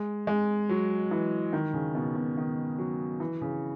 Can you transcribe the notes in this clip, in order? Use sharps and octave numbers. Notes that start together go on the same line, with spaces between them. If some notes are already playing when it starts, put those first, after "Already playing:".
Already playing: G#3
G#3
F#3
E3
D#3
C#3
B2
B2
D#3
F#3
E3
C#3